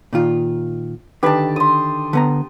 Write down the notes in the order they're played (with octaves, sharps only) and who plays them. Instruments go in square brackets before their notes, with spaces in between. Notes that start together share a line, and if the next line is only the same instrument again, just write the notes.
[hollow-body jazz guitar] A#2 D#3 F4
[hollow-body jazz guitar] D3 D#3 B4 [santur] G4 A5
[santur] C6 D#6
[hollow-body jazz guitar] D3 B3 A#5